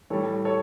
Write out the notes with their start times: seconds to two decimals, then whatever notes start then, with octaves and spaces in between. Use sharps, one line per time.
0.10 A2 G3 A4 C#5
0.45 A4 C#5